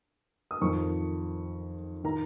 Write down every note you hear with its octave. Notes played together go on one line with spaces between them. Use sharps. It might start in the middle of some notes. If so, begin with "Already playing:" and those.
D#6
F2 D#3 C#6
D#3 A#5